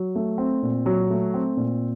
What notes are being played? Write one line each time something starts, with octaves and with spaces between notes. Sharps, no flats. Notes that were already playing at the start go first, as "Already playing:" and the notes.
Already playing: F#3
A3
C4
A#2
F#3
A3
C4
A#2